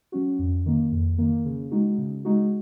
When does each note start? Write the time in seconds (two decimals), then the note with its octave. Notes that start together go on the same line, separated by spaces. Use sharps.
0.12 F#3 C#4 F#4
0.39 F2
0.66 D#3 A#3
0.92 F2
1.18 D#3 A#3
1.45 C#3
1.71 G#3 D#4 F#4
1.98 C#3
2.25 G#3 D#4 F#4